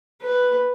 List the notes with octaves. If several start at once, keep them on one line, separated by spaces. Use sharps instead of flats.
B4